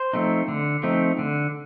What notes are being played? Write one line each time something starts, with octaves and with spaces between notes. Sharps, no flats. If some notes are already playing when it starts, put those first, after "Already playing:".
Already playing: C5
F3 A3 C4 D#4
D3
F3 A3 C4 D#4
D3